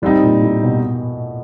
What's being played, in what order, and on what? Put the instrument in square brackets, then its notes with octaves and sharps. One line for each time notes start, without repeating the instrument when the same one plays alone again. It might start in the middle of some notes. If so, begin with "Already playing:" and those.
[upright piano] A2 [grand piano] G3 C4 D#4
[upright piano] A#2
A2
B2